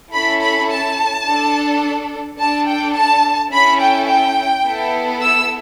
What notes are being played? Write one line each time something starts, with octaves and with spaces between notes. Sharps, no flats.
C#4 E4 A4 B5
B5
A5
D4 A4
D4 A4 A5
G5
A5
C#4 E4 A4 B5
G5
G5
B3 E4 A4
E6